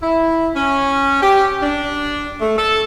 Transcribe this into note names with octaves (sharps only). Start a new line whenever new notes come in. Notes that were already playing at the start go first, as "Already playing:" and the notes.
E4
C#4
G4
D4
A3
A4